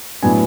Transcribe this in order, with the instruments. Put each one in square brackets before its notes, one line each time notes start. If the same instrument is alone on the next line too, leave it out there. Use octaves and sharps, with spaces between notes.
[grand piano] A2 F#3 B3 D4 G#5